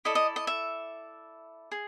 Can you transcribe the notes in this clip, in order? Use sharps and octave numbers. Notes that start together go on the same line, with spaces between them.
E4 A4 D5 D#5
D#5
D#5
E5
G#4